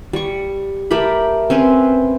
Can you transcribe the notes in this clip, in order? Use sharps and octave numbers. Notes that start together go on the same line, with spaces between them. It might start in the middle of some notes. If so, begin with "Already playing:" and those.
G3 C#6
A3 G4 A#4 B5
C4 C#4 B4 C5